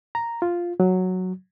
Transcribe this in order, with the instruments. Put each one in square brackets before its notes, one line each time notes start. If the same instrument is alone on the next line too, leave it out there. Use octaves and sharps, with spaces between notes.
[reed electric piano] A#5
F4
F#3